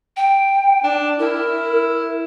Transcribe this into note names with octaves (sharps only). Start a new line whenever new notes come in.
G5
D4
E4 A#4